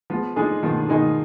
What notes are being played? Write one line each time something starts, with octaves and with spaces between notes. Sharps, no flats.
F3 G#3 B3
D3 F3 G#3 D#4 G#4
B2 D#3 F3
D3
B2 D#3 G#3 D#4 G#4